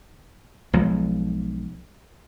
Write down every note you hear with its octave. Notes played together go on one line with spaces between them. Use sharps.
B1 F3 G#3